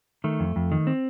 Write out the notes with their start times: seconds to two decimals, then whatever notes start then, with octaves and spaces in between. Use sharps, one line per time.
0.24 D#3 A3
0.40 F2
0.56 F2
0.72 D#3
0.87 C4